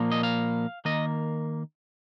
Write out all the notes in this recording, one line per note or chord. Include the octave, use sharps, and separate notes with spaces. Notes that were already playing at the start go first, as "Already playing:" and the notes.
Already playing: A#2 F3 A#3
D#5
F5
D#3 A#3 D#5